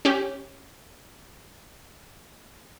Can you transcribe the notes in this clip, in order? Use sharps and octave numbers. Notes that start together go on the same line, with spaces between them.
C#4 G4